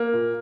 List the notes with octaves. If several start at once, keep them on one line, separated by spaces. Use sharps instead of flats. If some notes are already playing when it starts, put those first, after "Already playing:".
Already playing: A#3
A#2